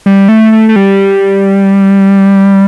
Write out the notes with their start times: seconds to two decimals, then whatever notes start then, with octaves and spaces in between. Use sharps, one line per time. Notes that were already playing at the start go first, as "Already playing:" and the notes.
0.06 G3
0.29 A3
0.52 A3
0.69 A3
0.76 G3